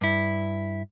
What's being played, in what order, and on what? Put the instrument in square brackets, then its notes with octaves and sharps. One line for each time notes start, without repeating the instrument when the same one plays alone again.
[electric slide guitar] G2 E4